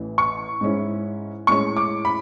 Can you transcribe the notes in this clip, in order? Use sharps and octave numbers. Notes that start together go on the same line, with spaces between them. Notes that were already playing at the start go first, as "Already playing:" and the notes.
Already playing: A1 A2 E3
C#6
G#2 G#3 C#4 E4
A2 G#3 C#4 C#6
D6
B5